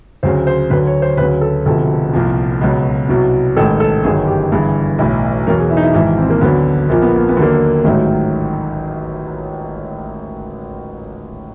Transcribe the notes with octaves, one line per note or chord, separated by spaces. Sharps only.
D2 C#3 F#3 C5
C5
D2 D3 F#3 B4
C#5
C5
D2 C#3 F#3 B4
A4
E1 D2 C3 F3 A4
C2 A#2 F3
C#2 B2 F#3
C2 B2 F#3
A1 G#2 D#3 A4
A4
G1 F#2 D#3 F#3 G#4
G4
G1 G2 E3 G#4
B1 A2 E3
E2 B2 F#3 A#4
G#4
E4
D#4
E4
G#1 G#2 E3 E4
C4
A#3
D2 D3 F#3 B3
A#1 A#2 F3 A#3
B3
A#3
B3
D#2 D3 F#3 A#3
A1 G#2 D#3 F#3 A3